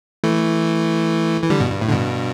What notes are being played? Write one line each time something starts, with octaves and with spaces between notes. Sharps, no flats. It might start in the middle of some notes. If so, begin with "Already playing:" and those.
E3 A3
E3
D3 G3
G2 B2
G2
A2
D3
G2 B2